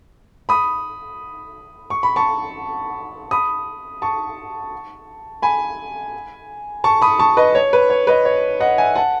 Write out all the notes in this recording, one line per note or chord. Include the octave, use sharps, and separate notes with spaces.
B5 D#6
C#6
B5
A5 C#6
B5 D#6
A5 C#6
G#5 B5
A5 C#6
B5 D#6
A5 C#6
B4 D#5
C#5
B4
C#5
B4 D#5
C#5
D#5 F#5
E5 G#5
F#5 A5